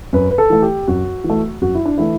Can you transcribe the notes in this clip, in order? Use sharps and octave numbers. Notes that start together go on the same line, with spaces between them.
F#2 B4
B4
A4
E3 A3
G4
F#2 F#4
E3
A3
F#2 F#4
E4
D4
E3 A3 E4